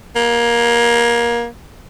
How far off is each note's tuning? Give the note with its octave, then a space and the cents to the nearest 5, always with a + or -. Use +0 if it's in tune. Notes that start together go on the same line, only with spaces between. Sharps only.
A#3 +20